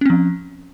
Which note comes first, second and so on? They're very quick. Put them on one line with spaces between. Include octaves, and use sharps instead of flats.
C#4 C4 F3